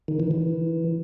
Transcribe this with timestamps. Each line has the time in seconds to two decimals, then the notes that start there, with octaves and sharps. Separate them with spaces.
0.08 D#3
0.20 E3
0.31 E3